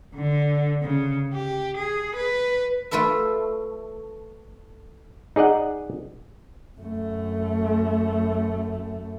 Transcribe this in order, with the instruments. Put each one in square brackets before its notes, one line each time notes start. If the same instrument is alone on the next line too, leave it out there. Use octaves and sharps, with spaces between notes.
[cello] D3
C#3
G4
G#4
B4
[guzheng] A3 F4 A4 B4 E5
[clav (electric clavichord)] D#4 G#4 D5 D#5 F#5
[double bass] F#2 A3